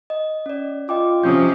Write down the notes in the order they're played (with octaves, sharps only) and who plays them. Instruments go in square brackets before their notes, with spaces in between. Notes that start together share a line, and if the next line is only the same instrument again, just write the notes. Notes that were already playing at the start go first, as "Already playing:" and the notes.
[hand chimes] D#5
C#4 D5
[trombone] F4 [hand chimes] D#5 G5 D6
[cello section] C3 F3 C#4 [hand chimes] D#6 G6